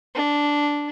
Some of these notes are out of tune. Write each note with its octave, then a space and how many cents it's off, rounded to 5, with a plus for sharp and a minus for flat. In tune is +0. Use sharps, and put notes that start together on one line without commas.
D4 -5